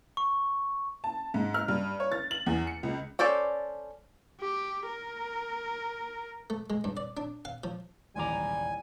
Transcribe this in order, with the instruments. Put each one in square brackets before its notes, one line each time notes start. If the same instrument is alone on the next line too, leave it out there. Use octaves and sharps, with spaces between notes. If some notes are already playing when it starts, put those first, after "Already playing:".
[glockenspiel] C#6
[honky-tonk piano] A5
G#2
F6
G2
C#5
A6
F#7
E2
C#7
C#2
[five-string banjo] C#4 A4 C5 D5
[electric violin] G4
A#4
[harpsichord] A3
G#3
G2
D5
D4
F5
F3
[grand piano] D#1 A1 D6 [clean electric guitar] C3 G#3 A#5 [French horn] G3 [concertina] G#5